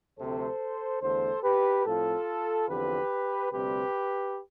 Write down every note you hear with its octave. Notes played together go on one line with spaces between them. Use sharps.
D2 C3 F3 A3 C4 A4 C5
E2 D3 A3 A4 C5
G4 B4
A2 F3 C4 F4 A4
E2 D3 F3 C4 G4 B4
D2 C3 G3 C4 G4 B4